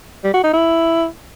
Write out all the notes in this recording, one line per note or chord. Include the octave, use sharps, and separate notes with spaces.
G3
F#4
D#4
E4